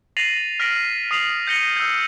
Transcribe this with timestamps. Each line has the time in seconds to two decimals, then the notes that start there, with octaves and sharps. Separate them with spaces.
0.17 A6 A#6 C7 D#7 F7 F#7
0.60 F6 A#6 B6 D7 F#7
1.11 D#6 C7 F7 F#7
1.47 G6 A#6 C#7 D#7 G7
1.77 E6 G6